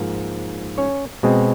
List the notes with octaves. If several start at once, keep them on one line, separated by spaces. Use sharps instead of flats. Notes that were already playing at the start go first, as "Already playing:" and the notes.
Already playing: G#2 F3 A#3
C#4 C#5
B2 G#3 C4